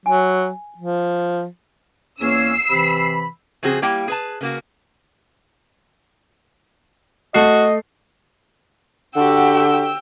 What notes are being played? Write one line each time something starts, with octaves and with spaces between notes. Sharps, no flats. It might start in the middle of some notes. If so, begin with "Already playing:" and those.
F#3 G#5
F3
E2 A#3 C#4 E6 C7
C3 E3 B5
C#3 F3 C4 F#4 G#4
G3 A#3 E4 G4 G5
G#4 B4 A5
C#3 A#3 F#4
A3 F#4 D#5 C7
D3 F#4 G4 G5 E6